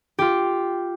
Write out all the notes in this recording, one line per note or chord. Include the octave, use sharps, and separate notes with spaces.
F4 G4